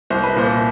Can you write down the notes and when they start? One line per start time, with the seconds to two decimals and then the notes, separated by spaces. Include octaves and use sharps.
0.10 C2 C5
0.24 B4
0.36 A#2 C5